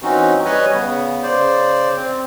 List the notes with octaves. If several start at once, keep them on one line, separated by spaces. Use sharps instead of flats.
E3 C4 C#4 D#4 F#4
G3 B4 C#5 D#5 G#5
C#3 B3
C#3 C5 D5
C4